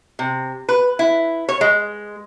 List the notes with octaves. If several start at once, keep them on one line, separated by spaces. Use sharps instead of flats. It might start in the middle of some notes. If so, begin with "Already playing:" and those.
C3
B4
E4
C#5
G#3